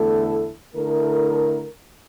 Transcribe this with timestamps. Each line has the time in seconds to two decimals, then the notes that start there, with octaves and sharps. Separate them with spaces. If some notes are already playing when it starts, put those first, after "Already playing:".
Already playing: E2 D3 A3 E4 A4
0.75 D3 A3 E4 A#4